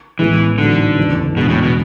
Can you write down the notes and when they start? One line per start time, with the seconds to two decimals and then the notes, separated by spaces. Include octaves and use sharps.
0.19 A1 A2 E3 G#3 B3 E4
0.58 A1 G#2 D3 F#3
0.97 F#1 E2 C#3
1.36 E2 B2 D3 G#3 D4 F#4
1.50 A2
1.62 B2